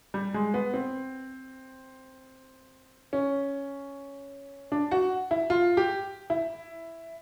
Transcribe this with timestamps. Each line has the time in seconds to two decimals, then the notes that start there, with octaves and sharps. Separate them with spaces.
0.14 G3
0.34 G#3
0.54 B3
0.74 C4
3.13 C#4
4.72 D4
4.91 F#4
5.31 E4
5.50 F4
5.77 G4
6.30 E4